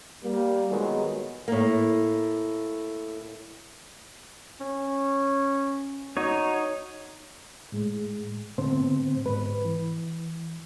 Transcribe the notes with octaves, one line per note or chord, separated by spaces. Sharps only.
G3 A#3
A#2 D#3 F#3 G#3 B3
A2 A#3
C#4
D#4 F#4 C#5
A2 G#3
A2 D3 B3 C4 C5
G#2 B4
E3